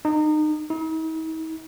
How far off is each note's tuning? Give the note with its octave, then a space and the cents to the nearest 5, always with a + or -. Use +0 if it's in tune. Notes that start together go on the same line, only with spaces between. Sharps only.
D#4 -30
D#4 +45